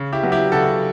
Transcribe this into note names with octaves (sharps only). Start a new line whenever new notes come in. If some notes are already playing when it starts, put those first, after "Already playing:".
Already playing: C#3
E4 G4
F#3 B3
E4 G4
C#3 F#4 A4